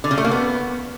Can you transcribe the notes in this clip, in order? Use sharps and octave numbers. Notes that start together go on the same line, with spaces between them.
D3
C#3
A3
A#3
B3